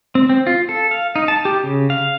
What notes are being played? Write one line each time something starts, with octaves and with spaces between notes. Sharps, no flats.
C4
C4
F4
A4
F5
D#4
A5
G4
C#3
F5